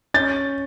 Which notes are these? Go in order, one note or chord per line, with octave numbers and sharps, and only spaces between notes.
C#4 G6 A6